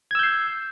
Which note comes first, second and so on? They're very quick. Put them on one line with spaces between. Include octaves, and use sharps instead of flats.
G#6 E6 G6 C7